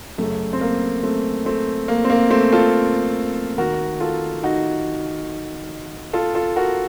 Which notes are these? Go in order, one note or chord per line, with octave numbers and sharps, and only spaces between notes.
F#2 C#3 A3
C4
A#3
A3 C4
A3 C4
A#3
C4
A#3
A3 C4
F4 A4
D#2 D#3 F#4 A#4
F4 A4
D#4 F#4
F4 A4
F4 A4
F#4 A#4